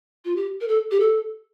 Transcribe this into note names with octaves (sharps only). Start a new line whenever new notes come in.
F4
G4
A#4
A4
G4
A4